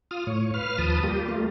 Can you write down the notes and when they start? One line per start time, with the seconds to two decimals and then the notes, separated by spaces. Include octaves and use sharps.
0.11 F4 D#6 F6
0.27 A2 C#5
0.54 B4 F5 F6
0.78 D#2 F3 B4 A5 D#6
1.03 G3 A#3 F4 G4
1.29 G3 A3 A#3 F4